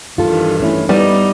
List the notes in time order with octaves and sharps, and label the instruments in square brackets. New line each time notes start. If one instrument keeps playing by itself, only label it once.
[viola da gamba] G2 D#3 E3 [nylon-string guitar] F4 A4
[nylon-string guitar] A3 C#4 E4
[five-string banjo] G3 [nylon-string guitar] B3 [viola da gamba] D#4